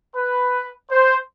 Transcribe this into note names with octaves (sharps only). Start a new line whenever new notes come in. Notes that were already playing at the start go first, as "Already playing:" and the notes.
B4
C5